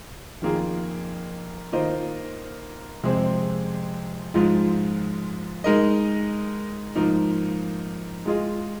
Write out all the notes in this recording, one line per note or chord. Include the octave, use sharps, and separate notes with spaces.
F2 D#3 A#3 F4 G#4
D#3 A#3 F4 C5 D#5
F2 C3 G#3 C4 G#4
G#2 F3 G#3 F4
G#3 D#4 A#4 D#5
G#2 F3 A#3 D#4
G#3 F4 G#4 D#5